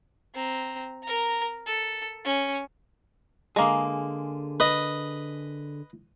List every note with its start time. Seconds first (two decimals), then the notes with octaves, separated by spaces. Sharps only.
0.35 C4 A#5
1.03 A#4 A#5
1.66 A4
2.25 C#4
3.56 D3 G#3 A#3 G#4
4.60 B4 D#5